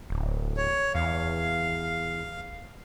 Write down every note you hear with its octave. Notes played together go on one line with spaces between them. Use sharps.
D1
C#5
E2 F5